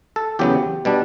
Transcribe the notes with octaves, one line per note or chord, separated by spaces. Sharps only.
A4
E2 C#3 F#3 B3 G4
B2 G3 D4